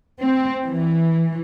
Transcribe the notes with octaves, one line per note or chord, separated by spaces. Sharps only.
C4
E3